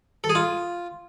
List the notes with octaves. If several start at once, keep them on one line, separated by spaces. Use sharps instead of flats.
A4
G#4
F4